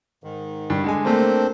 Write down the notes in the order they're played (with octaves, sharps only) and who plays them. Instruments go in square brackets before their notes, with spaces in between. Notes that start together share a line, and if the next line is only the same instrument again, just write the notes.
[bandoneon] G#2 D#3
[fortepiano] G2
D3 G#3 G#5
[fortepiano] A3 A#3 [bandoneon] C4 D4 C5